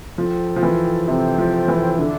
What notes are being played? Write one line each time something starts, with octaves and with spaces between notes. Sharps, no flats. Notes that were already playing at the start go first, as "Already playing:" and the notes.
F3 A4 C5 G5
F3
E3
C3 A4 C5 G5
F3
E3
D3 D4 A4 E5